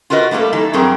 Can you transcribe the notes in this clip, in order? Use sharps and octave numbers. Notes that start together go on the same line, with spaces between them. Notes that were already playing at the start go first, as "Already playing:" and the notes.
F4 F#4 A#4 B4 D#5
G3 A3 A#3 F#4 A4
E3 D#4 A4
G2 F#3 C4 G#4 A#4